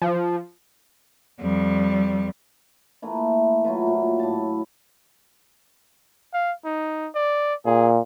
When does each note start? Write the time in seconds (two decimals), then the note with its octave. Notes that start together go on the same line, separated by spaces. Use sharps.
0.02 F3
1.40 F2 G3
3.02 E3 A3 A#3 E4
3.64 F#3 E4 F4 B4
3.87 A#2
4.19 A2 E5 A5
6.33 F5
6.65 D#4
7.15 D5
7.66 A#2 G#4